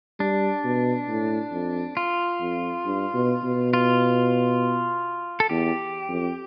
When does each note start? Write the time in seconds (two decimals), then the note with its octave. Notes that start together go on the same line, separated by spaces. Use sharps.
0.20 G3 D4
0.64 B2
1.08 A2
1.52 F2
1.97 F4
2.40 F2
2.85 G2
3.14 B2
3.44 B2
3.74 F4
5.40 A4
5.50 E2 G4
6.09 F2